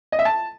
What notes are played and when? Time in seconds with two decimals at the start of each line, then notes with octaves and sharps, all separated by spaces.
0.12 D#5
0.19 E5
0.25 A5